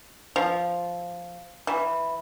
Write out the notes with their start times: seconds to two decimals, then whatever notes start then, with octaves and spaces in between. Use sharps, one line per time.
0.36 F3
1.67 E3